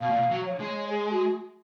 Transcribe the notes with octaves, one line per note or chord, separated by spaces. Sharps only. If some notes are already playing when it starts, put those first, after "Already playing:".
B2 F5
A#2
B2
F#3
C#5
G#3
G#4
F#4